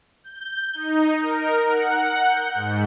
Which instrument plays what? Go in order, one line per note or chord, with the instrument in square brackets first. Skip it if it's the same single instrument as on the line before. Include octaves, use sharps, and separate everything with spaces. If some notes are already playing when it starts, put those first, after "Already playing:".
[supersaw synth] G6
D#4
A#4
F#5
G6
G#2